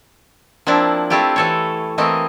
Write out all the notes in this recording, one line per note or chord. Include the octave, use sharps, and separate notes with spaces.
F3 A#3 C4 D4 E4
A3 C4 E4 F4 G4
E3 A4 C#5
E3 A3 A#3 C4 D#5